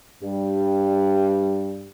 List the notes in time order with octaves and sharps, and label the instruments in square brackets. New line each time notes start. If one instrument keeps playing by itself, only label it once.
[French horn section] G2 G3